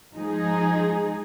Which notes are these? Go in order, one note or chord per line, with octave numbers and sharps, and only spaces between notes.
F3 G#3 D#4 G#4